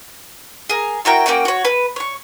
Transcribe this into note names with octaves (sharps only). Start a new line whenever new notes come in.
G#4 A#4
E4 F#4 A#4 G5
A#3 C#4 F#4 G5
F#4 C#5
B4
C#5 C#6